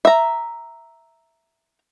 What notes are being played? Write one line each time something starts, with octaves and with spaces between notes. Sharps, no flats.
E5 A#5